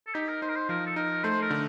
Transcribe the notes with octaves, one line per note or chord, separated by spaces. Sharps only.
A4
D#4 G4
A#4
D#4 C5
A#4
C5
F3 A#4
A4
D#4 A#4
A3 C5
A#4
D3